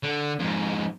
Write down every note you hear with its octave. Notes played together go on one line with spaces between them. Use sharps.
D3
F2 G#2